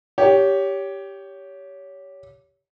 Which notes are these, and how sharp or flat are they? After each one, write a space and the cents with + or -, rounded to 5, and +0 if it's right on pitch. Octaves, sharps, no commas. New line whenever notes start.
G4 +0 C#5 +20